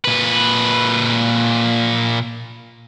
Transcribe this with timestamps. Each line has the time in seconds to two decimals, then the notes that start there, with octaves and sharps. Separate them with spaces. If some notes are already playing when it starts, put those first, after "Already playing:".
0.05 A#2 B4